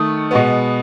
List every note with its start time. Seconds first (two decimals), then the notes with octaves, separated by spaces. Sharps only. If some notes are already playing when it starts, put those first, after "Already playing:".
Already playing: D#3 A3 D#6
0.31 B2 G#3 B3